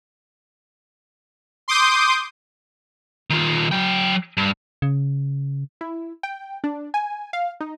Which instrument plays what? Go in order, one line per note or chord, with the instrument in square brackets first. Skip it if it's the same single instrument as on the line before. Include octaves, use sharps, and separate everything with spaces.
[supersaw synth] C6 D6 D#6 G6
[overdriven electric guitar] D#3 F4
F#3 G5
G2
[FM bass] C#3
[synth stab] E4
G5
D4
G#5
F5
D#4